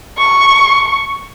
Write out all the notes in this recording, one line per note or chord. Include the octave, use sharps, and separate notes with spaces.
C#6